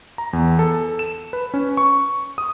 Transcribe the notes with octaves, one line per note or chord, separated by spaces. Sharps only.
A#5
E2
A4
E7
B4
C#4
C#6
D#6